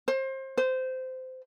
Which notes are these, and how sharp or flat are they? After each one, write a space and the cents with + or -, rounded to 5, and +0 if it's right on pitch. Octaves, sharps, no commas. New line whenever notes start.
C5 +30
C5 -20